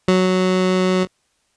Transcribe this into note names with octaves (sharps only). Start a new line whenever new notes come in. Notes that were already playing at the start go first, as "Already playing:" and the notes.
F#3